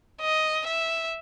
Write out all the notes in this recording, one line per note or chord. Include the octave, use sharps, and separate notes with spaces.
D#5
E5